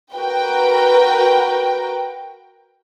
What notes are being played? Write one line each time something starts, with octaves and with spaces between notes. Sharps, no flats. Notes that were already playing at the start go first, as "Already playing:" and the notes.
F#4 A#4 B4 G5